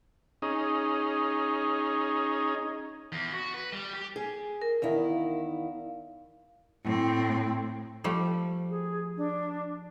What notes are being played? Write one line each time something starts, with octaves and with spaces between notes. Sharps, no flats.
C#4 D#4 G#4
E2
F#4
B4
G3
G4
G#4
A#4
E2 D#3 E4 F5
A2 C4
F3 G3 A3
G#4
D4